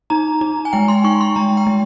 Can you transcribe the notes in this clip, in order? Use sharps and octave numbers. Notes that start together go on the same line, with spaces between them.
D#4 A#5
D#4
G#5
G#3 G5
C6
D#4 C#6
C6
G#3 A#5
G5
G#3